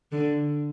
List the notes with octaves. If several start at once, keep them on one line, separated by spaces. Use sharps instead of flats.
D3